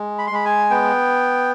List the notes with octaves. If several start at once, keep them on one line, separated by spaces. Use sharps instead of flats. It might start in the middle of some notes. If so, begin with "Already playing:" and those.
Already playing: G#3
B5
C6
G#3 B5
G#5
B3 G5